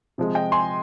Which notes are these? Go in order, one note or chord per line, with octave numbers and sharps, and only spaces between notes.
C3 F3 G#3
D#5 G5
G#5 C6